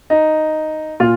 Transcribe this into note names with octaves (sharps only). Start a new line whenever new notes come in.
D#4
A#2 F4